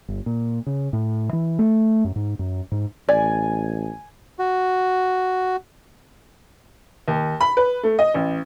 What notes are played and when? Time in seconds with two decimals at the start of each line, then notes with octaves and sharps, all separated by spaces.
0.08 G1
0.26 A#2
0.67 C#3
0.93 A2
1.33 E3
1.59 A3
2.04 F#2
2.16 G#2
2.39 F#2
2.72 G#2
3.09 A1 D5 G#5
4.39 F#4
7.08 D#2
7.41 B5
7.57 B4
7.83 A3
7.99 D#5
8.14 A1